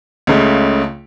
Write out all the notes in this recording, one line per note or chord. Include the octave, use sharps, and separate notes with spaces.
C#2 C#3 A3